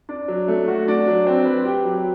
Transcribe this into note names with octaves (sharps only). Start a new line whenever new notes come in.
D4
F#3
A3
F#4
D4
F#3
C4
B4
G4
F#3